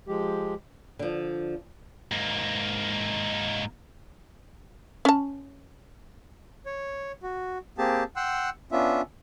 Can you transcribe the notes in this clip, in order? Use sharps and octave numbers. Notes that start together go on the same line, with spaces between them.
F3 G#3 G4
D3 F3
G#2 A#3
C#4 A5
C#5
F#4
A#3 C4 G4 G#4 A5
F#5 G5 C6 E6 F#6
B3 C#4 D4 F4 E5